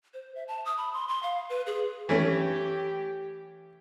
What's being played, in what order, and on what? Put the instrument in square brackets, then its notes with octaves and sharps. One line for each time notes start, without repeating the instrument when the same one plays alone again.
[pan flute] C5
E5
A5
D#6
B5
C6
C6
F5
B4
G#4
[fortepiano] E3 A3 C#4 [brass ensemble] G4